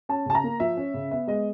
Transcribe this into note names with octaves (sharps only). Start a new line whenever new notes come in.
C#4 A5
C#3 A5
A#5
A#3
F3 E5
C#4
C#3
B3 E5
G#3 D#5